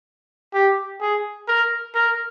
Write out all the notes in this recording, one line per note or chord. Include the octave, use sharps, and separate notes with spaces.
G4
G#4
A#4
A#4